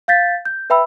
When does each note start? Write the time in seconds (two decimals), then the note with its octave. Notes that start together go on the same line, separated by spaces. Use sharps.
0.08 F5 G6 A6 B6
0.45 G6
0.70 B4 E5 G5 B5 E6